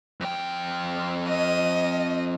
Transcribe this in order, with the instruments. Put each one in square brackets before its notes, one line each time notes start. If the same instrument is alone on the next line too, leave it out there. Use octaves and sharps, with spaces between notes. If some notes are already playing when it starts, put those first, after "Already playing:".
[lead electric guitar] F2 G5
[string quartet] D#5